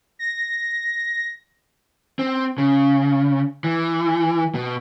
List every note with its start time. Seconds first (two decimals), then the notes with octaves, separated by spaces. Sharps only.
0.19 A#6
2.19 C4
2.58 C#3
3.64 E3
4.55 B2